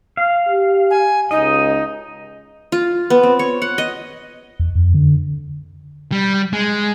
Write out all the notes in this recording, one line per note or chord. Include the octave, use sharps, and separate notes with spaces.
F5
G4
G#5
C#2 D#4 D#5
F4
B3
C4
C#5
F#5
D#5
E2
F2
D3
G3
G#3